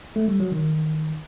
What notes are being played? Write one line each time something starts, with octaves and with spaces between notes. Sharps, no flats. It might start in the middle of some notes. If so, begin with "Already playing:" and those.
A3
G3
F#3
D#3